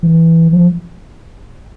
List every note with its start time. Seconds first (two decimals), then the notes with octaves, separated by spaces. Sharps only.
0.03 E3
0.53 F3